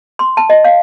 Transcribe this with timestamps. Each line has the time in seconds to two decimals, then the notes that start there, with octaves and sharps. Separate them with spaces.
0.19 C6
0.37 A5
0.50 D#5
0.64 F5